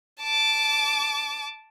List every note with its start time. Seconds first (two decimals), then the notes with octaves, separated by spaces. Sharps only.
0.21 A5 D6